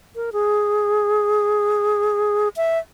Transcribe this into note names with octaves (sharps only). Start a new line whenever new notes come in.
A#4
G#4
E5